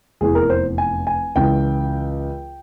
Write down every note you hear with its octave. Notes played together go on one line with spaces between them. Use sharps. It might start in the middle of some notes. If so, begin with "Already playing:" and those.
F1 E2 E3 G#4
A#4
C5
G#5
G#5
C#2 C#3 E3 G5